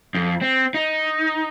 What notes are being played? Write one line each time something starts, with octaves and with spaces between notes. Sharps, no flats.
F2
C4
D#4